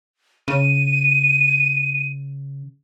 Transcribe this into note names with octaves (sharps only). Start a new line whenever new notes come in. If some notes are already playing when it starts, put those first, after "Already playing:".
C#3 D#7